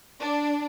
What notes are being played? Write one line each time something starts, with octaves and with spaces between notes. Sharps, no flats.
D4